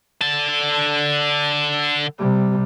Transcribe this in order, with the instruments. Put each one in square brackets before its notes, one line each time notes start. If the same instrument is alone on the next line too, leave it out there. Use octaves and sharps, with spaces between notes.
[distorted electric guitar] D3 A5
[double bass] C3 G3